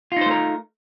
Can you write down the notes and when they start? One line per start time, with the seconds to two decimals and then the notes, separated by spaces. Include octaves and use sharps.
0.12 F4
0.16 D#4
0.21 C5
0.26 A3
0.31 A#4